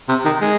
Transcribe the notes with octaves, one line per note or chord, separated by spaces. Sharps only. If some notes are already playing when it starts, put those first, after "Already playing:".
C3
D#3
G#3